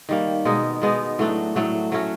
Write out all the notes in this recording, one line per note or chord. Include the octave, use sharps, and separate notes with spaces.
D#3 G3 A#3
B2 G#3 B3 D#4
B2 G#3 B3 D#4
A2 F#3 A3 D4
A2 F#3 A3 D4
F#3 A3 C#4 F#4